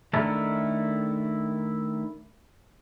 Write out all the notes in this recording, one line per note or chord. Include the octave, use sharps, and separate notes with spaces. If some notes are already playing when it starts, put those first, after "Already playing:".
D#3 A3 D4 E4 A4 A#4